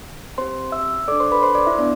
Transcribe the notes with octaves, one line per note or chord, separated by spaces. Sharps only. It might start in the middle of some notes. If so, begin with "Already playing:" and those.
C4 G4 C5 C6
E5 E6
D4 A4 D5 D6
C5 C6
B4 B5
C5 C6
D5 D6
E4 E5
B3 D4 D5